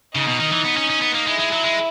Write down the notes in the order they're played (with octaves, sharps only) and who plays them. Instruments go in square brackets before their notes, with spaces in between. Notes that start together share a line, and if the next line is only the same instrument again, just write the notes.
[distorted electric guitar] C#3 [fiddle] D#4
[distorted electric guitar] B2
D#3
E3
B3
C#4
C#4
B3
A#3
[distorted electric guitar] G#3 [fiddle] E4
[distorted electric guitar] G#3
F#3
G#3